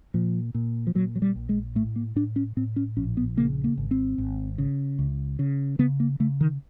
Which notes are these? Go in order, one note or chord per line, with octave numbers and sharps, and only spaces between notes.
A#2 F3
A#2
F3
A#2 F#3
F#3
G3
A#1
G#3
A2 A3
A#3
A2 D4
C#4
A2 C4
C#4
A#1 C#4
B3
C#3 A#3
A#3
G#1
C4
G#1
C#3
C#2
C#3
C#3 B3
A#3
C#3 A3
D#3